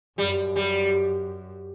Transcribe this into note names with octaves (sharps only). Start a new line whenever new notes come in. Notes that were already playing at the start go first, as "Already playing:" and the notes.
F#2 G3
G3